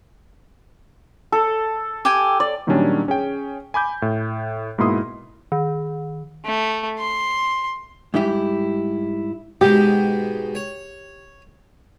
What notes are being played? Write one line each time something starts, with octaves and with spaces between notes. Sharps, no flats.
A4
G4 G5 G#5
D5
A#2 D#3 F#3 G3 C#4 D4
C#4 G#4 G5
G#5 B5 D6 G6
A2
G#2 B2 A#3 E4 C6 D#6
D#3
A3
C6
G#2 G3 D#4 E4 G4
G#2 B2 G#3 G4
C#5